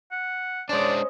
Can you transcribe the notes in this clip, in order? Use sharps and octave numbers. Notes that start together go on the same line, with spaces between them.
F#5
G#3 C#4 D4 C5 D5 D#5